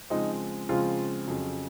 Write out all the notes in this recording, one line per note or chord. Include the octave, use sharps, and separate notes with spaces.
C#3 F3 G#3 C4 D#4
C#3 F3 G#3 C4 F4
F2 C#3 F#3